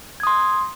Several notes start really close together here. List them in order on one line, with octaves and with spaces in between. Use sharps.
G#6 D#6 C6